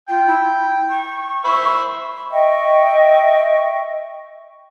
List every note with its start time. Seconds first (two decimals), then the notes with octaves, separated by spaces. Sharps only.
0.08 F4 G5
0.26 E4
0.89 C#6
1.45 C5 E5 B5
2.31 D#5 E5 G5 C#6